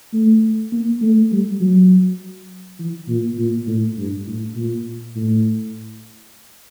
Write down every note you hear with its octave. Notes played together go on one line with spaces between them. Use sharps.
A3
A#3
A3
G3
F#3
E3
A#2
A#2
A2
G2
A2
A#2
A2